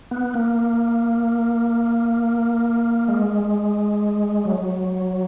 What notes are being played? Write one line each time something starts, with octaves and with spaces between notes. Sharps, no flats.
B3
A#3
G#3
F#3